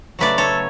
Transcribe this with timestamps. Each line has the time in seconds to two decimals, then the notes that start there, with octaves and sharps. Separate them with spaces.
0.19 C#3 F#3 A3 B4 D5
0.38 A4 C#5